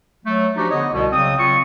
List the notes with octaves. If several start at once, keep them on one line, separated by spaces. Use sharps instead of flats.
F#3 A3
F3 D4 D#4 F#4 G4
D3 B3 C#5 D#5
C2 B2
C#3 F#3 C4 D#6
C#3 F#3 C4 F4 C#6